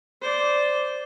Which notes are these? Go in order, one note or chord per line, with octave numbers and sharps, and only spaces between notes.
C5 D5